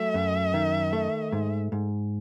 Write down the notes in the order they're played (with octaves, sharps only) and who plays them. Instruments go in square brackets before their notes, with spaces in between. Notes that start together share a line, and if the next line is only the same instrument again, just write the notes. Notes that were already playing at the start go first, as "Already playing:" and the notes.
Already playing: [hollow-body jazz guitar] F#3 A3 [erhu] E5
[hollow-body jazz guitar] F#2
D#3
A3
G#2
G#2